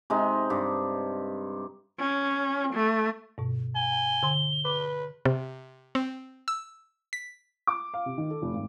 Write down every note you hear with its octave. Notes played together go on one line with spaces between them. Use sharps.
C3 G#3 D#4
G2
C#4
A3
G2 B2
G#5 G7
D3 C6
B4 D6
C3
C4
E6
B6
D6
F5
C3
D#3
A4
F1
G#1